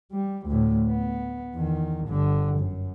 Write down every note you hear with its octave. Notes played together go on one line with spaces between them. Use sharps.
G3
D2 A2
B3
E2 D#3
G1 D3
F#2